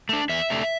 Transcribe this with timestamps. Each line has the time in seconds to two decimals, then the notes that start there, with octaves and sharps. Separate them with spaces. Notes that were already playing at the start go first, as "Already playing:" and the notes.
0.09 A3 D4
0.29 E2 E5
0.50 C3 A3 D4